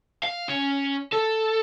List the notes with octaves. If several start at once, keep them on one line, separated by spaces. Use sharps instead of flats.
F5
C#4
A4